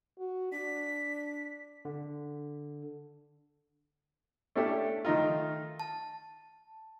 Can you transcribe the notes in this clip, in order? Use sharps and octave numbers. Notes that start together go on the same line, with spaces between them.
F#4
D4 B6
D3
A3 C#4 D4 E4 G4 A4
D#3 A3 D#4 F4
A5